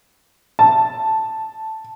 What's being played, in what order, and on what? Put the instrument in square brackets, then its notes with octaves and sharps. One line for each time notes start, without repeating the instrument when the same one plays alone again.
[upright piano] A5